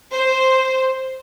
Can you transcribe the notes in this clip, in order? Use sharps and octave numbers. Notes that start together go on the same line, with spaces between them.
C5